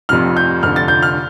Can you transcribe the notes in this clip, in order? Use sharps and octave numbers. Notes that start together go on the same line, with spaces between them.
F1 F2 C3 F3 F6
G6
F1 F2 D3 F3 F6
A6
G6
F6